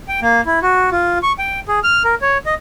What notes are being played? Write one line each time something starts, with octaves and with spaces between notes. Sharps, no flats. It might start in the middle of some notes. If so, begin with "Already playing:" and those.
G5
A#3
E4
F#4
F4
C#6
G5
G#4
F6
A#4
C#5
D#5